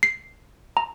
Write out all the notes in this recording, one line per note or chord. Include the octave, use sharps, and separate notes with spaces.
C7
A#5